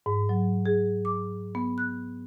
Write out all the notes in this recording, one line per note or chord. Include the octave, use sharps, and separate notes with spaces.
G#2
F#3
G#4
D6
B3
F#6